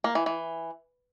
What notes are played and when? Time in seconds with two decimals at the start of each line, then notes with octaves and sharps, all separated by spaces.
0.04 A#3
0.15 E3
0.26 E3